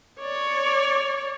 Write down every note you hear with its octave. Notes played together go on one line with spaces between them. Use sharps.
C#5 D5